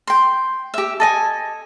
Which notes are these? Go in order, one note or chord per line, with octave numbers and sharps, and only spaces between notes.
G5 C6
G4 E5
A4 D#5 G#5